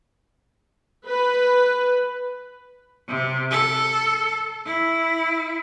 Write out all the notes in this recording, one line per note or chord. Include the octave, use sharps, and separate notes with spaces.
B4
C3
A4
E4